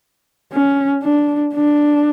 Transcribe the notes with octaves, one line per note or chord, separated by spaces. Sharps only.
C#4
D4
D4